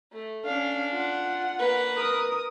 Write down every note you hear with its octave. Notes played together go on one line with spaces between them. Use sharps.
A3
C#4 D4 F5
F4 F#5
A#3 B4
A#4 D#6